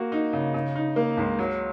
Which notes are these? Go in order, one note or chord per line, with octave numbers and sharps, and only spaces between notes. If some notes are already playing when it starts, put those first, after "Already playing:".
Already playing: A#3 F#4
D#4
C#3
C#3
D#4
A#3
C#2
F#3